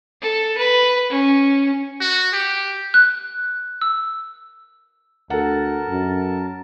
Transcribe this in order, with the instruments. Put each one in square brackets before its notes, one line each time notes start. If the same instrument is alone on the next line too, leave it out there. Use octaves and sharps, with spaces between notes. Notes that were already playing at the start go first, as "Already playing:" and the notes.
[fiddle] A4
B4
C#4
[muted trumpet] F#4
G4
[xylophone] F#6
E6
[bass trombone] D2 [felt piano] A4 F#5 [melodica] A#4 A5
[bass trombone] F#2